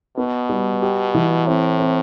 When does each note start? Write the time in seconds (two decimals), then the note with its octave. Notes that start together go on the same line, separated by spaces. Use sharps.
0.17 B2 B3
0.49 G3
0.82 G4
1.14 E3
1.47 A2 C4
1.80 C4